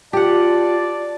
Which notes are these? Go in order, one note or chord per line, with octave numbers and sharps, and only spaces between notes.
F4 G4 D5 F#5 A5